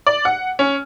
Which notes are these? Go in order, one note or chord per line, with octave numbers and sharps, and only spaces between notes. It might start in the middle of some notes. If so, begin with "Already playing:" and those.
D5
F#5
C#4